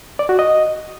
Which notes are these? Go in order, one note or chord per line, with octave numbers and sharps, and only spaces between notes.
D5
F#4
D#5